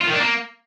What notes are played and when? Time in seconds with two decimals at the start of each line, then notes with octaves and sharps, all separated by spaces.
0.01 F4
0.07 D#3
0.14 D4
0.20 A#3